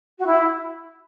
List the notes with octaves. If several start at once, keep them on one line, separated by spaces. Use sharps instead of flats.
F#4
E4